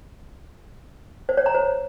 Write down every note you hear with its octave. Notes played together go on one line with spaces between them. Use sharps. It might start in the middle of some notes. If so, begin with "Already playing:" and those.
C5
C#5
A#5
C5